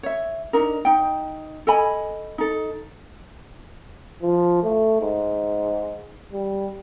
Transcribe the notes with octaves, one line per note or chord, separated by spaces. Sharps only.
C#5 E5
D4 D#4 A#4
D#4 G5
A4 D#5 G#5 B5
D#4 A4
F3
A3
G#2
G3